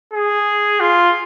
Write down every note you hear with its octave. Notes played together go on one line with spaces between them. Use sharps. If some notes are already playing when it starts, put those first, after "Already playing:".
G#4
F4